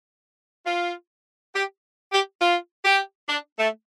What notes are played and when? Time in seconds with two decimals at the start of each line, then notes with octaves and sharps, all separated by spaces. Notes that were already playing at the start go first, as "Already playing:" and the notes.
0.67 F4
1.54 G4
2.13 G4
2.42 F4
2.85 G4
3.29 D4
3.59 A3